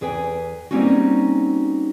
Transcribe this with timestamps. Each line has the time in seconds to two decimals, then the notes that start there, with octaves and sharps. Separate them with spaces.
0.01 E2 G#4 B4 G5 G#5
0.71 G3 A#3 C4 C#4 D#4 F#4